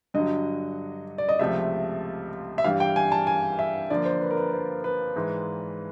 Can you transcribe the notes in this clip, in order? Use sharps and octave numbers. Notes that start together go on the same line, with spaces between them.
G2 D3 F#3 D#5
D5
D#5
C#2 C3 F3 A3 E5
E5
G2 E3 G3 F5
G5
G#5
A5
G#5
E5
D3 F3 A#3 D5
C5
B4
A#4
B4
C5
B4
G#2 E3 G#3